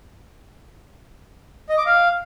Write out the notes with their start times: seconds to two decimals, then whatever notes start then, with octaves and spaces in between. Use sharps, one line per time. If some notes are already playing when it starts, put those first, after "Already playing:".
1.69 D#5
1.78 D6
1.86 F5